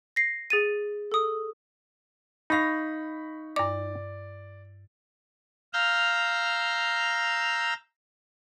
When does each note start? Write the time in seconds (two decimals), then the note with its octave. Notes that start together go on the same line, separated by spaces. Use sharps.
0.16 A#6 C7
0.50 G#4 A6 D#7
1.12 A4 D#6
2.50 D#4 F5 B5 C#6 A#6
3.56 G2 D5 D6
5.73 F5 A#5 E6 F6 G6